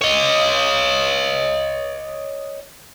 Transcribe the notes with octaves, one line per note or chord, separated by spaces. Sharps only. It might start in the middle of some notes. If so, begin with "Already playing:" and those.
C#5 D#5